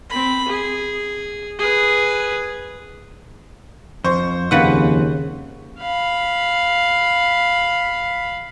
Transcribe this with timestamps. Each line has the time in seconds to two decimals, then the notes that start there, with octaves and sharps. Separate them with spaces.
0.10 C4 B5
0.48 G#4
1.59 G#4 B4
4.04 F2 C5 C#6
4.51 D#2 C#3 B4 F#5
5.79 F5 B5